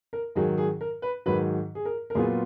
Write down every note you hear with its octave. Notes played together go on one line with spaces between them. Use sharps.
A#4
G#2 D#3 F#3 G#4
G#4
A#4
B4
G#2 D#3 F#3 B4
G#4
A#4
A#4
A#2 F#3 B3 F4 G#4